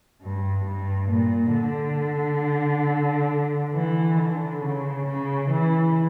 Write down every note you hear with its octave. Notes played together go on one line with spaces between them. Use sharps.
G2
G2
A#2
D3
E3
D3
C#3
C#3
E3